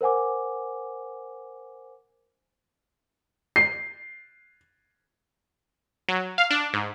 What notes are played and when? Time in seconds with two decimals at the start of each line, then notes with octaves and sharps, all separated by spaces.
0.01 A#4 C5 F#5 G#5 D6
3.56 C7
6.09 F#3
6.38 F5
6.50 D4
6.73 G#2